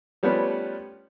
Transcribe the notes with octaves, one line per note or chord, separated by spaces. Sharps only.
F3 G3 A3 B3 C#4 B4